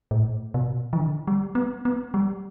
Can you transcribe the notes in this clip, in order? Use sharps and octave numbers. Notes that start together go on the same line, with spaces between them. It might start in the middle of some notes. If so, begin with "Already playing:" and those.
A2
B2
E3
D3
G3
B3
B3
G3